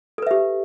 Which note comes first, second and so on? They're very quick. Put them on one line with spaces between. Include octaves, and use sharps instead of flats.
A4 B4 E5 G4